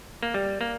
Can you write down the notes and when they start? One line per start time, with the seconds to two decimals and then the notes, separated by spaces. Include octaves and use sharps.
0.23 A#3
0.34 G3
0.61 A#3